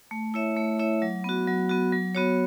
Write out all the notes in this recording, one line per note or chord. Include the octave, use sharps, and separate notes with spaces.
A3
E4 C#5 E5
A3
E4 C#5 E5
F#3
B3 F#4
F#3
B3 F#4
F#3
B3 F#4 C#5